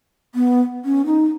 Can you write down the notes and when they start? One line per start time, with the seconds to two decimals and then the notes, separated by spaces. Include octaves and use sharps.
0.35 B3
0.85 C#4
1.06 D#4